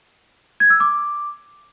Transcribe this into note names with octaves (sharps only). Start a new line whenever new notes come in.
G#6
E6
D6